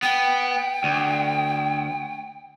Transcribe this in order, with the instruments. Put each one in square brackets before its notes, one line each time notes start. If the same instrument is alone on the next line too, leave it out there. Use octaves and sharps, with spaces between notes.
[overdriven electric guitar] B3 [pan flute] G5
[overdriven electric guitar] D2